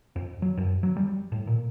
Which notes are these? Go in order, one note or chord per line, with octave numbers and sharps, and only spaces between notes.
F2
F#3
F#2
F#3
G3
A2
A#2